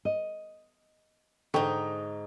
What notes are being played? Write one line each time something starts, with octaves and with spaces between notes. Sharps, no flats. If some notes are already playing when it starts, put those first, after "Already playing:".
D#5
G#2 D3 D#4 G5 C#6